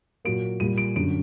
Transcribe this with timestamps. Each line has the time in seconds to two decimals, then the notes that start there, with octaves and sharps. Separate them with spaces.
0.25 A#2 F#3 A#3 D7
0.60 A#2 G3 A#3 D#7
0.78 D7
0.96 F#2 D3 F#3 D7